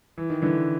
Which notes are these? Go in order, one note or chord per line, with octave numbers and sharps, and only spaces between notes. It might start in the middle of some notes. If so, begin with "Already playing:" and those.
E3
D#3
D3 E3